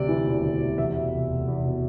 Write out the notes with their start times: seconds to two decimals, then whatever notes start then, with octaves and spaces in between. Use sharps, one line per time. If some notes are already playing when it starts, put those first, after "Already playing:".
Already playing: D2 C3 D5
0.08 E3
0.26 E1
0.43 D2
0.60 C3
0.78 E2 E5
0.95 B2
1.13 F1
1.30 F1
1.48 E2
1.65 B2